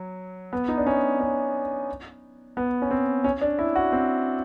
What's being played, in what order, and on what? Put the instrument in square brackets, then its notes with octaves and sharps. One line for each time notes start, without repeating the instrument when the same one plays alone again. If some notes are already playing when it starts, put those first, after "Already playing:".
Already playing: [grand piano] F#3
B3
D#4
D4
C#4
C#4
B3
C#4
C4
C#4
D4
E4
F#4
C4